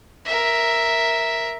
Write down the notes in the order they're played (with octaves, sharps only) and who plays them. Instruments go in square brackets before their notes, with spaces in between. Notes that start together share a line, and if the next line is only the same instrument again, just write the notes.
[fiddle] A#4 E5